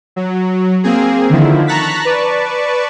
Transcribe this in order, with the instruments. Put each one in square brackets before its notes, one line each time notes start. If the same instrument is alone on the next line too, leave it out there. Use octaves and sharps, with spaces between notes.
[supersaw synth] F#3
A#3 C4 G#4
D3 D#3 F3 E4
A5 A#5 C#6 F#6 A6 B6
B4 D5 A5 C#6